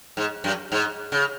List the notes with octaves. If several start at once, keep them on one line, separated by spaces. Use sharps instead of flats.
G#2
F#2
G#2
C#3